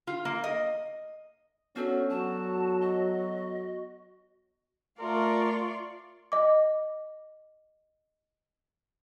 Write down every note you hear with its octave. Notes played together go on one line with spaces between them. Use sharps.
F4
A#3
D#5
B3 C#4 D4 F#4 A4
F#3 F#4 A5
D#5
A3 F4 A#4 D5 C6 C#6
D#5 D6